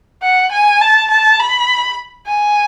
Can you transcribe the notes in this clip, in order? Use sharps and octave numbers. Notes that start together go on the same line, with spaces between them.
F#5
G#5
A5
A5
B5
G#5